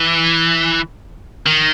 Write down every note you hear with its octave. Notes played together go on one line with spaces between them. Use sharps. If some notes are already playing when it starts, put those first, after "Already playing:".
Already playing: E3
D#3